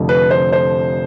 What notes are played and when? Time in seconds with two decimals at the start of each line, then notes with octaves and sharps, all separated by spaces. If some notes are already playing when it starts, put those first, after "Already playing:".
Already playing: F1 F2 D3 F3
0.09 B4
0.31 C5
0.52 C5